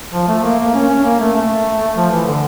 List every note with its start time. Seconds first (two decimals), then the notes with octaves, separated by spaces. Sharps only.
0.13 F3
0.28 A3
0.43 A#3
0.59 A#3
0.74 C#4
0.89 C#4
1.04 A#3
1.20 A3
1.35 A3
1.95 F3
2.10 E3
2.26 D3